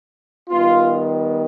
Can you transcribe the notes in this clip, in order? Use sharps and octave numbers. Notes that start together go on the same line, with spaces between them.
D#3 G3 B3 F4